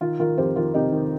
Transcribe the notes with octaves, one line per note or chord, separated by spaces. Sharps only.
D#3 F4
D#3 F4 A#4
F2 G4 C5
D#3 F4 A#4
C3 D#4 G4
D#3